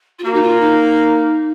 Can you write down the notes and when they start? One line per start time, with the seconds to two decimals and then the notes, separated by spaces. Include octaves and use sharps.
0.19 F4
0.24 A#3 F#4
0.34 D#4
0.42 F4
0.61 D#4